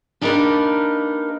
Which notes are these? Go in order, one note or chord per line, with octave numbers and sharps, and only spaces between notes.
A#3 D4 D#4 G4 A#4 B4